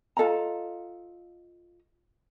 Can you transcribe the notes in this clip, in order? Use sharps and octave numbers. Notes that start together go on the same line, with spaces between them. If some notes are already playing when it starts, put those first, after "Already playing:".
F4 A4 D#5 A#5